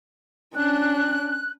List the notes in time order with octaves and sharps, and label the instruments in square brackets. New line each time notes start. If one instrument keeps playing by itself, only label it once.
[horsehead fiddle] C#4 D4 [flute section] F#6